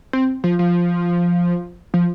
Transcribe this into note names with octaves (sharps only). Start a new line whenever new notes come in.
C4
F3
F3
F3